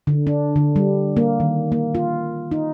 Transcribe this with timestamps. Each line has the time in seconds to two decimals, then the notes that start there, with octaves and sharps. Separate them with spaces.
0.07 D3
0.27 D4
0.56 D3
0.76 G3
1.17 A#3
1.40 D#3
1.72 A#3
1.95 F4
2.52 D#4